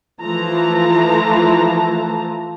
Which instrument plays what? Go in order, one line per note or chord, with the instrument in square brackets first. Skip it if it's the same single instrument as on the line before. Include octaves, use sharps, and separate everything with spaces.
[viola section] E3 F3 A3 F4 A5 A#5